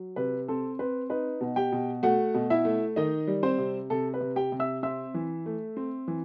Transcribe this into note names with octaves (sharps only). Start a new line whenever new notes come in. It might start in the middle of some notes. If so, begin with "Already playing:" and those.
Already playing: F#3
C3 B4
C4 A4
C4 B4
D#4 B4
B2
G4 G5
B2
A3 F#4 F#5
B2
E4 E5
A3
D#3 D#4 D#5
G3
C4 C5
C3
C3 A4
B4
C3
G4 G5
C3
E5 E6
C4 E5 E6
E3
A3
C4
E3